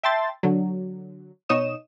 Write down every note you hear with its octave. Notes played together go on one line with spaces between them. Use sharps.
E5 G5 A5 C6 A6
D3 F#3
B2 D#4 C#5 D#5 D#6 E7